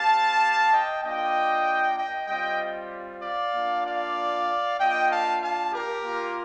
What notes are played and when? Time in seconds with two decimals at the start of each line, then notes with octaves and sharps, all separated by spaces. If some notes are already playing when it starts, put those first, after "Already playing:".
Already playing: C4 G4 F5 A5
0.71 D#5 G5
1.03 A#3 D4 F4 D#5 G5
1.97 D#5 G5
2.28 G3 C4 F4 D#5 G5
3.23 D5 F5
3.54 A#3 D4 F4
3.86 D5 F5
4.79 A#3 D4 F4 D#5 G5
5.11 F5 A5
5.42 F5 A5
5.73 G4 A#4
6.04 A#3 F4